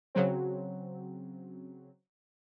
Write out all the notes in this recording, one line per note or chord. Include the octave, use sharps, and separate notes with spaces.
C#3 F#3 C4